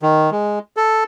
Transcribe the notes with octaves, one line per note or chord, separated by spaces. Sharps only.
D#3
G#3
A4